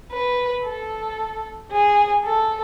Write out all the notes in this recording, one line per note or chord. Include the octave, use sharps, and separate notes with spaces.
B4
A4
G#4
A4